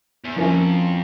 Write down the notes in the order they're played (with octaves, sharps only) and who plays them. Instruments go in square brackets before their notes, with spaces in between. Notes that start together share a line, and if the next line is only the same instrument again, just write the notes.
[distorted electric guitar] E2
[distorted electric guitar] F2 [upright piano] F3 A#3 C#4 E4